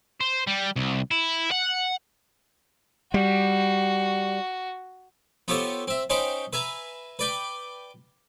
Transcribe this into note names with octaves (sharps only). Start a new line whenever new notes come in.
C5
G3
C2
E4
F#5
G3 F#4
B3 F4 G4 A4 C5 C#5
C4 E5
C#4 D#4 C5 F5 G5 B5
B4 E5 G#5 A#5
B4 D5 G5